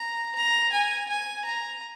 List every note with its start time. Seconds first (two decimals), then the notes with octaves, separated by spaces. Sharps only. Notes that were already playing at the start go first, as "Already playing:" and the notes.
Already playing: A#5
0.35 A#5
0.72 G#5
1.08 G#5
1.44 A#5